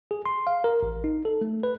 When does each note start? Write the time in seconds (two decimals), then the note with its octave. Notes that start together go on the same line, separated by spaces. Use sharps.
0.11 G#4
0.26 C6
0.47 F5
0.64 A#4
0.83 A1
1.04 D#4
1.25 A4
1.41 A3
1.63 B4